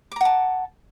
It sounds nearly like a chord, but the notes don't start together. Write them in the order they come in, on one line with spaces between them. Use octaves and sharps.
D6 A#5 F#5 A5